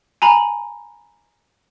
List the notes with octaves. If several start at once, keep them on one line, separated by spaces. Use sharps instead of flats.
G#5 A#5 B5